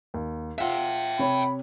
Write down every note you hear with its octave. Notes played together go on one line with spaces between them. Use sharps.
D#2
F4 E5 F#5 G5
C3 C#5 B5